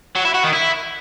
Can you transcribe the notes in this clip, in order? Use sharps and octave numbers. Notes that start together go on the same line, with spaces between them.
F#3
E4
F#4
D#3
E4